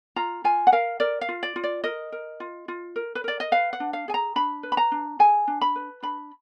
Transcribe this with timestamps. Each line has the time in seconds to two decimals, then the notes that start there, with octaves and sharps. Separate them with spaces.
0.16 F4 A#5
0.44 F4 G#5
0.67 F#5
0.72 A#4 F5
1.00 A#4 D5
1.21 F5
1.29 F4
1.43 D5
1.56 F4
1.64 D5
1.84 A#4 D#5
2.12 A#4
2.40 F4
2.68 F4
2.96 A#4
3.15 B4
3.24 A#4 D5
3.40 D#5
3.52 B4 F5
3.73 F#5
3.80 D4
3.93 F5
4.08 G#4 G#5
4.14 A#5
4.36 D4 B5
4.63 B4
4.72 B5
4.77 A#5
4.92 D4
5.19 G#4 G#5
5.47 D4
5.61 B5
5.76 B4
6.02 D4 B5